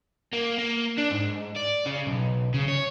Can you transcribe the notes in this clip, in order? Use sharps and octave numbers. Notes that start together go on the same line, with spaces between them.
A#3
A#3
D4
G#2
D5
C#3
B1
C#3
C#5